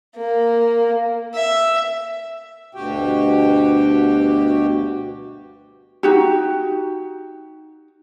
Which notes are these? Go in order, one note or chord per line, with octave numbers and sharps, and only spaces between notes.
A#3
E5
D2 G2 B2 F#4 G4 G5
D#4 F#4 G4